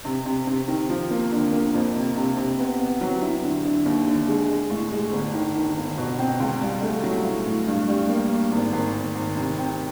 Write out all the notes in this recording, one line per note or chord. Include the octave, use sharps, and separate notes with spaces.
C3
C3
C3
D#3
F3
A#3
D3
A#3
F2
C3
C3
C3
B3
B3
F#3
E4
D3
D3
D#2
D3
G#3
G#3
A2
G#3
G1
D#3
D#3
G1
B2
C4
C#2
G3
A3
F#3
A2
A2
G2
G3
A#3
A#3
G#1
G#1
G#1
G#1
C3
C4